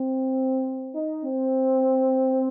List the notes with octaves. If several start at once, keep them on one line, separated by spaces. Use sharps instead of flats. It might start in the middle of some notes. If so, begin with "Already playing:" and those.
Already playing: C4
D#4
C4